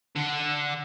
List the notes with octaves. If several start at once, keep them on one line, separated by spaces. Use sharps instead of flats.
D3